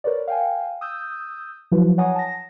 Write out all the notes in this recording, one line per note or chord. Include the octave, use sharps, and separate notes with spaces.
A#4 B4 C#5 D5
F5 G5 G#5
D#6 E6 G6
F3 F#3 E4 F#4 B4
C#5 F#5 G#5 A#5 D#6
A5 A#6